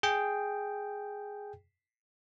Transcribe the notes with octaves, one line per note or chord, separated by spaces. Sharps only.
G#4 G5